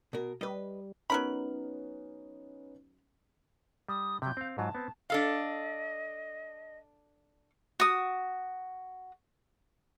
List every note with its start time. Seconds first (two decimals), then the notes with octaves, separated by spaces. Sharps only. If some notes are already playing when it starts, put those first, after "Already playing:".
0.13 B2 A#4
0.41 G3 B4 D#5
1.10 F#3 B3 C#4 D#4 A#4 B5
3.88 G3 D#6
4.22 C3 F#3 G6
4.37 C4 F5
4.58 G#2 F#3 F4 A5
4.75 B3 C4
5.10 D4 A4 D#5 F5
7.80 F#4 D#6